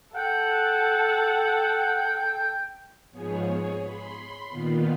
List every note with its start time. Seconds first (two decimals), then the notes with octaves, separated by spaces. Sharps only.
0.16 A4 F#5 G5
3.12 G#2 F3 B3 G#4 C#5
3.50 G#4 C#5
3.81 B5 C6
4.48 A#2 D#3 B3 F4